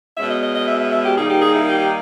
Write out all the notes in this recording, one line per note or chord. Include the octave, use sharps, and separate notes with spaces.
B2 G#3 C#4 E5
D#5
D#5
D#5
E5
E5
E5
G4
D#3 G3 A#3 D#4 G#4
G4
G#4
E4
G4
G4